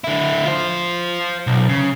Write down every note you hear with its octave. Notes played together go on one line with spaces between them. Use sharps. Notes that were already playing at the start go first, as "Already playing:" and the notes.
D3 E4
F4 C5
B1
C#3